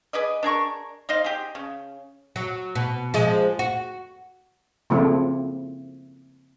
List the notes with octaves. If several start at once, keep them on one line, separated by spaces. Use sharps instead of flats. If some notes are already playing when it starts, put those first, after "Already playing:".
G#4 B4 D5 D#5
D4 G#4 A#4 C#6
D#4 C5 D#5 F5
G4 G#4
C#3
F#3
B2
F3 G#3
F#4
C#3 F3 A3 A#3 C4 E4